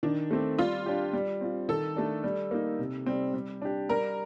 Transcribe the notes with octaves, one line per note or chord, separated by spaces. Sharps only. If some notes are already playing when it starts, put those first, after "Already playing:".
D#3 D4
A3 C4
G3 F4
D4 G4
G3
C4 F4
D#3 A4
A3 D4
G3
A#3 D#4
C3
G3 C4
G3
D4 G4
G3 A#4